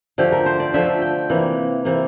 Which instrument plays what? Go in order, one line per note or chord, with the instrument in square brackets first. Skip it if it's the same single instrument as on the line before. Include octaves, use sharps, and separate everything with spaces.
[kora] D3 F3 A3 G4
A#4
C5
D5
D3 F3 A3 E5
G5
C3 E3 A#3
C3 E3 A#3